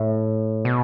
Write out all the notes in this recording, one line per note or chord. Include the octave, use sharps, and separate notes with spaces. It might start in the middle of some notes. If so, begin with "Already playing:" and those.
Already playing: A2
B2